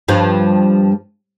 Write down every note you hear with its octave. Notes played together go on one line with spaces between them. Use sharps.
G2 F3